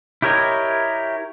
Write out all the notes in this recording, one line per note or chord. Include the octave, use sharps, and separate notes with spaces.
E4 G4 A#4 C#5 D#5